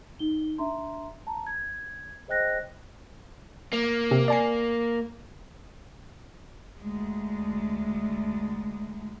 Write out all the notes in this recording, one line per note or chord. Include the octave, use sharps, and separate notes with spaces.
D#4 G7
D4 E5 A#5 C6
A5 A#5
G#6
G#4 C5 D#5 G5 F#6 A#6
A#3
C3 C4
D5 G#5 C7
D2 G#3